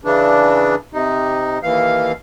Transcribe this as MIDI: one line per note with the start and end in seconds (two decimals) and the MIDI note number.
0.05 0.75 49
0.05 0.75 52
0.05 0.75 62
0.93 1.58 48
0.93 1.58 63
1.63 2.12 39
1.63 2.12 52
1.63 2.12 77